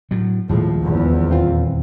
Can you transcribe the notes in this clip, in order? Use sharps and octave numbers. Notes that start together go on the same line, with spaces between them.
A2 F#3
D#1 A2 F3 G#3
A#1 E2
C4 F4